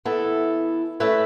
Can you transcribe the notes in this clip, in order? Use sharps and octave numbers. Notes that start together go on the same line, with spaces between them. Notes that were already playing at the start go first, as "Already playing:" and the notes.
E3 B3 E4 A4
A3 C#4 E4 B4